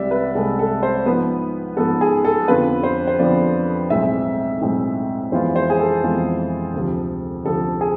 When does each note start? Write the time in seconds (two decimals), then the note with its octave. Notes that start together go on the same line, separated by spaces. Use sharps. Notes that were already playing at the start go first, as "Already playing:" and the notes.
Already playing: C2 C3 G#3 D5 E5
0.11 B4
0.35 C2 C3 G#3 A4
0.59 A4
0.83 C5
1.06 G#2 F3 B3 B4
1.77 G#2 F3 B3 A4
2.01 G#4
2.25 A4
2.48 F2 D3 F3 B3 F4 B4
2.83 C5
3.07 C5
3.19 F2 D3 F3 B3 F4 D5
3.90 B1 A2 G#3 C4 E5
4.61 B1 A2 G#3 C4
5.32 F2 E3 G#3 B3 F4 C5
5.56 C5
5.70 G#4
5.79 A4
6.03 F2 E3 G#3 B3 F4
6.74 D2 C3 F3
7.44 D2 C3 F3 A4
7.81 G#4